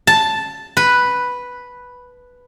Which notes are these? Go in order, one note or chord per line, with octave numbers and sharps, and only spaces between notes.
A5
B4